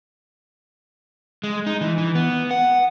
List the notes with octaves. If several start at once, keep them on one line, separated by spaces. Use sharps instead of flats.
G#3
D#4
E3
E3
B3
F#5